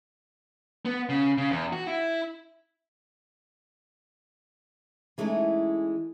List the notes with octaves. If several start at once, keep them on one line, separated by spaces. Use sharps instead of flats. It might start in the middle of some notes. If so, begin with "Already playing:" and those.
B3
C#3
C#3
E2
F#4
E4
E3 G#3 A3 C#4 D#4